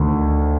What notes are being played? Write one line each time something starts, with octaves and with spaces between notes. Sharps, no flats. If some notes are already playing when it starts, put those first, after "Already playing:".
Already playing: D2 D#3